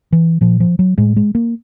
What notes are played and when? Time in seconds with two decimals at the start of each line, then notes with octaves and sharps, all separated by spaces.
0.12 E3
0.41 A#2 F3
0.60 F3
0.79 F#3
0.98 A2 G#3
1.16 G#3
1.35 A#3